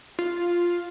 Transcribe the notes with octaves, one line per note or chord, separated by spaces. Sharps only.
F4